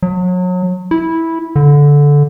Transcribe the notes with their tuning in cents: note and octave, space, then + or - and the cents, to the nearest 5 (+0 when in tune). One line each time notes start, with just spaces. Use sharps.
F#3 -30
E4 -10
D3 -15